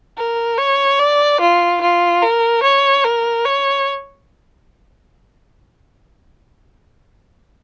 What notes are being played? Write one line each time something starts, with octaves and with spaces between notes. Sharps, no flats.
A#4
C#5
D5
F4
F4
A#4
C#5
A#4
C#5